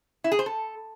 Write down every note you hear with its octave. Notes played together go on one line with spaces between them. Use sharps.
E4
G#4
C5
A4